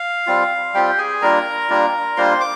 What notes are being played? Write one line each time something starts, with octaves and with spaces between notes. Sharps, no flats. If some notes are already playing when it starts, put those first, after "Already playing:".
Already playing: F5
G3 C4 F4
G3 C4 F4 G4 G5
G#4 G#5
G3 A#3 D4 F4 A#4 A#5
G3 A#3 D4 F4
G3 A#3 D4 F4 C5 C6
D6